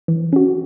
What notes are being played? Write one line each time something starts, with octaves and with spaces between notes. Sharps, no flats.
E3
C#4 F#4